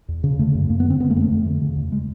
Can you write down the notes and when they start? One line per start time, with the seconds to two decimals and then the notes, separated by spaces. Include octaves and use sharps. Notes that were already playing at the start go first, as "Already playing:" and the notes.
0.08 E2
0.24 C#3
0.39 D3 A3
0.55 F#2
0.70 F#2 A#3
0.80 B3
0.85 D3
0.90 C4
1.00 D3 B3
1.10 A3
1.16 F2 A#3
1.20 A3
1.31 F2
1.46 D3
1.61 C#3
1.76 E2
1.92 G#3